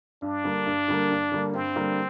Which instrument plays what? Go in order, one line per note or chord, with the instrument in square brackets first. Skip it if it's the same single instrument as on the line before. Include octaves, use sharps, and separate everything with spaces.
[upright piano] G2 [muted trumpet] D4
[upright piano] D3 G3 A#3
G2
D3 G3 A#3
G2
D3 G3 A#3
[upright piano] G2 [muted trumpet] C4
[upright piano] D3 G3 A#3